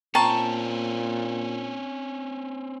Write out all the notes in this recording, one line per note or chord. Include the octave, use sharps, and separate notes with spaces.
A#2 C4 C#4 G5 A5 A#5 C#6